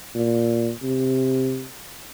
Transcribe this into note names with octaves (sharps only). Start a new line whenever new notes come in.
A#2
C3